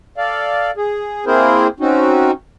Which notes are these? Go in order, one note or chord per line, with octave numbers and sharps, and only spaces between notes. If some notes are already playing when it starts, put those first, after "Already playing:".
A4 D5 F5
G#4
A#3 C4 E4 G#4 A#4 C5
C4 C#4 D#4 F#4